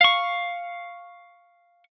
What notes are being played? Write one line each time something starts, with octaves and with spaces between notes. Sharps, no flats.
F5 C#6